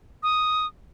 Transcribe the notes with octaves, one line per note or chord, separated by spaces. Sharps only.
D#6